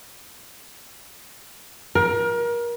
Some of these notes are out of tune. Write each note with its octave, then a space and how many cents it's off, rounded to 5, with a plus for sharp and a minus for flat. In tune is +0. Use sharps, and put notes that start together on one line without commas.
A#4 +30